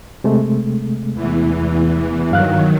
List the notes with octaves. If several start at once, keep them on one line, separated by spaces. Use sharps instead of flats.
C3 G#3 A3
E2 E3
G2 D#3 F#3 F5 F#6